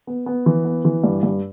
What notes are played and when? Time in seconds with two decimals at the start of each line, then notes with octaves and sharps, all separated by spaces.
0.07 B3
0.26 B3
0.46 E3
0.65 B3
0.85 E3
1.04 G2
1.23 G2